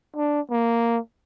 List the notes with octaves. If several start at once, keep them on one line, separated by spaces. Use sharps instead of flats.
D4
A#3